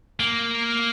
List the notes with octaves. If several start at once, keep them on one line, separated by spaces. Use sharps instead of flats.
A#3